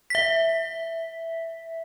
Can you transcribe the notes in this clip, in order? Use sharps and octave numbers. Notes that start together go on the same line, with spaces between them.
E5 B6